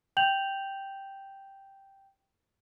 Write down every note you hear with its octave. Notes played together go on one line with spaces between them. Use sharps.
G5 G6 F7 F#7